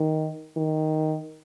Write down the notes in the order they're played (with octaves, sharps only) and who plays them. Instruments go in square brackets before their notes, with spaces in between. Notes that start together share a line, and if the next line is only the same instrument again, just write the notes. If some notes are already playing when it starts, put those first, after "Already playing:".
Already playing: [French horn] D#3
D#3